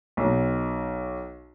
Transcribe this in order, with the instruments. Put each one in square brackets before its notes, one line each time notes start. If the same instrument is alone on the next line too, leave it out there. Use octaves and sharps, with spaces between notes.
[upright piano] B1